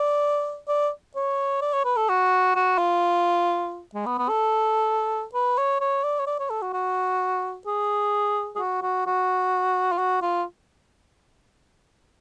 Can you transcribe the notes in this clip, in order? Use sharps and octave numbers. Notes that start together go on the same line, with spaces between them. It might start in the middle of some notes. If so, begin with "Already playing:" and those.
Already playing: D5
D5
C#5
D5
C#5
B4
A4
F#4
F#4
F4
G#3
B3
B3
A4
B4
C#5
C#5
D5
C#5
D5
C#5
A4
F#4
F#4
G#4
G#4
F#4
F#4
F#4
F4
F#4
F4